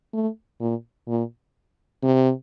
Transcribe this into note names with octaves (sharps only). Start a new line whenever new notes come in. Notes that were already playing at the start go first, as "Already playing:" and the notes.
A3
A#2
A#2
C3